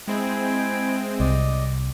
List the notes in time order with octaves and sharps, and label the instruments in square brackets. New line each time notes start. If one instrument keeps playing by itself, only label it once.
[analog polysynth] G#3 C4 [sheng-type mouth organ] E4 G#4 G5
[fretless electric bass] C2 [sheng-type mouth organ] D5 D#5